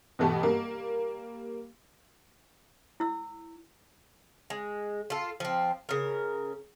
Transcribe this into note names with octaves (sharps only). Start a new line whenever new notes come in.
B2 E3 A3 B3 G4 A4
G3 A#3 A#4
E4 E6
G#3
F4 A4
F3 C4
C#3 A#4